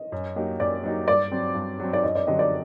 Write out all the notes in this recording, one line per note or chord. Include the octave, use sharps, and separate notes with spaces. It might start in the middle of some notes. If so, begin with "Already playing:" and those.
Already playing: D#5
F#2
F#3 A#3 D#4 G4
F#2 D5
F#3 A#3 D#4 G4
G2 D5
F#3 C4
G2
F#3 C4
D5
F#2 D#5
D5
D3 F#3 C4 G4 D#5
D5